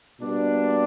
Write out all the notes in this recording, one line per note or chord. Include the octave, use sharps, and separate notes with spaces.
B2 G3 A#3 D4